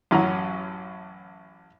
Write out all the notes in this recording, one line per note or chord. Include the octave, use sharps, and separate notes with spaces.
A1 F#2 C#4 F#5 A#5